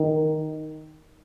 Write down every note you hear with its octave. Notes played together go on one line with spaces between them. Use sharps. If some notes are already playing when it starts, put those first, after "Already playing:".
Already playing: D#3